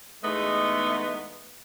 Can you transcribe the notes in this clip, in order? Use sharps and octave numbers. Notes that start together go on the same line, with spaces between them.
E2 G#3 A3 B3 D#4 D#5